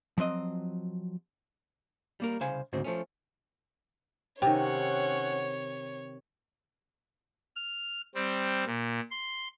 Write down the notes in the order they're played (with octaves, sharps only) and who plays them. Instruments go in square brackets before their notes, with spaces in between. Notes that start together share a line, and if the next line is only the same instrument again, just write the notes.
[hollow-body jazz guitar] F3 F#3 C4 D#5
G3 A#3 A#4
C2 C#3 C5 F5 G#5
D2 G#2 C#3 C4
F3 A3 C#4
[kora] C3 D#3 [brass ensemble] C4 C#4 F#5 [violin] C#5 [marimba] G5
[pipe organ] F6
G3 C4
A#2
C6